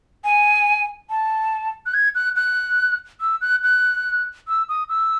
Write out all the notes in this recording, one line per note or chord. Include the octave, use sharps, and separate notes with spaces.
G#5
A5
F#6
G#6
F#6
F#6
E6
F#6
F#6
E6
D#6
E6